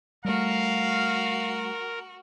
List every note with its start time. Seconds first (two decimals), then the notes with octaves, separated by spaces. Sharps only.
0.25 G3 A3 F#4 A#4 F5